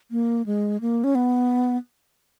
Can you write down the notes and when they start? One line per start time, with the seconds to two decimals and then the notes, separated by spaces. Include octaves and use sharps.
0.11 A#3
0.46 G#3
0.81 A#3
1.04 C#4
1.15 B3